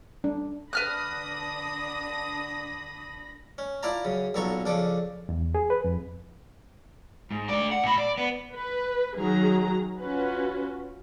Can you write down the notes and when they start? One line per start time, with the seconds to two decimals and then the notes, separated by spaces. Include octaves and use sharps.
0.24 D4
0.73 D3 D4 B4 B5 D#6 F6 F#6 A#6
3.58 C#4
3.83 E4 F4 D5 A5 A#5
4.05 F#2 C#3
4.34 B1 A#2 B3 A4 A#5 C#6
4.65 F2 C#3 D4 A4 D6
5.29 E2
5.55 G#4
5.70 B4
5.84 F2
7.31 G#2
7.49 A3 D5
7.72 F#5
7.84 A#2 B5
7.98 D5
8.18 B3
8.52 B4
9.17 D#3 F#3 G#4 A#5
9.99 C#4 F4 F#4 B4